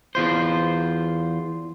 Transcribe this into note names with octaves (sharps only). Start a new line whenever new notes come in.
E2 F4 C5